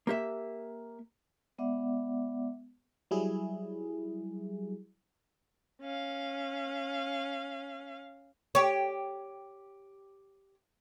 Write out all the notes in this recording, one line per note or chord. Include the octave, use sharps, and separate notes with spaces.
A#3 G4 E5
G#3 B3 D5 E5 F#5 D6
F#3 G3 E4 G#4
C#4 F5
G4 C#5